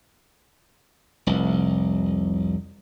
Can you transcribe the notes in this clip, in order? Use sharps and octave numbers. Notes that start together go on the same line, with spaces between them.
F1 C2